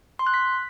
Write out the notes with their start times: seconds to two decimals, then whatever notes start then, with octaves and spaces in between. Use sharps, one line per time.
0.19 C6
0.27 F#6
0.34 B6